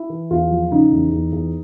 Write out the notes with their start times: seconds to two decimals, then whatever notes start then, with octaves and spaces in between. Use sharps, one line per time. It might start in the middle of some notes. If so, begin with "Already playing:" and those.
Already playing: E4
0.10 E3
0.31 E2 F4
0.51 F3
0.72 C#3 D#4
0.92 E2
1.12 E2
1.32 E2